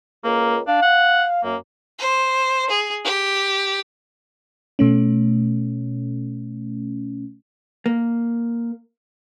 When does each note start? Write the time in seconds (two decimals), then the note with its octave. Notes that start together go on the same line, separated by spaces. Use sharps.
0.24 C#2 A#3 A#4
0.67 D4 F5
0.82 F#5
1.44 F#2 A#3
1.99 C5
2.70 G#4
3.05 G4
4.79 B2 A3 C#4
7.86 A#3